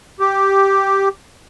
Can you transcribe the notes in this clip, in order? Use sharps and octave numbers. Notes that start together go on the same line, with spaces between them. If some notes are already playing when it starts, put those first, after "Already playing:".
G4